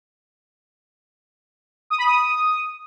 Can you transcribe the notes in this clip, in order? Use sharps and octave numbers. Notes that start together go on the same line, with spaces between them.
D#6
B5
D#6